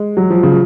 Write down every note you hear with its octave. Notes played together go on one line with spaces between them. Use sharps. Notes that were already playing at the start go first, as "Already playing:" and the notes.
Already playing: G#3
F#3
F3
C#3